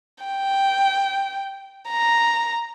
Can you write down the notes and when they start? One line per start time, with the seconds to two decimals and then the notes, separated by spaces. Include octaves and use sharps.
0.24 G5
1.89 A#5